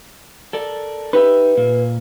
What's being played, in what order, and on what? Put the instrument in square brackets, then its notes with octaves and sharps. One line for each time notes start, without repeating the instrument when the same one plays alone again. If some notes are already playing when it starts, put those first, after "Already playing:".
[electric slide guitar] A4 A#4 D5
[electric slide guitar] D#4 G4 E5 [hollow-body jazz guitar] B4
[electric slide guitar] A#2 A#3